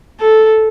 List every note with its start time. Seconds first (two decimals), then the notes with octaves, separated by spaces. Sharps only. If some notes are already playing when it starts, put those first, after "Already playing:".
0.21 A4